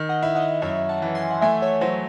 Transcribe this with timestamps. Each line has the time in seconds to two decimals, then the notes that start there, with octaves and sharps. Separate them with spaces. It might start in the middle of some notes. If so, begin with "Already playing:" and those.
Already playing: D#3
0.09 D#5 F#5
0.23 E4
0.35 D#5 F#5
0.62 F#2 C#5 E5
0.89 F#5 A5
1.02 E3
1.15 G#5 C6
1.31 F#5
1.41 A3 E5 G#5
1.62 C#5 E5
1.81 F#3 C5